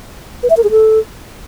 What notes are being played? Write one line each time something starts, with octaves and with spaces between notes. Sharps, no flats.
B4
E5
A#4
G#4
A4